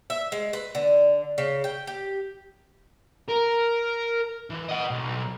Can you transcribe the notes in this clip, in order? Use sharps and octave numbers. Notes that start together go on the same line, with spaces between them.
E5
G#3
B4
D3
C#3
G5
G4
A#4
E3
D#5 F#5
B1